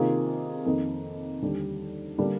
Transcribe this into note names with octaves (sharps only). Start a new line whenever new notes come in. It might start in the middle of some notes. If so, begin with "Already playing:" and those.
Already playing: C3 D#3 A#3 F4 G#4
F2 D#3 A#3 D#4 A#4
D#2 D3 G3 D4 G4
D3 G3 A#3 D4